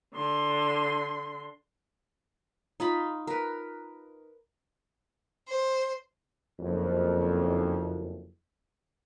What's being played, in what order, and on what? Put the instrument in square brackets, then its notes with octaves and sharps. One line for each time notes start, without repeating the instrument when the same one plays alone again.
[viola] D3 C6
[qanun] D#4 F4 B5
A#4 B4
[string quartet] C5
[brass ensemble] F#1 F2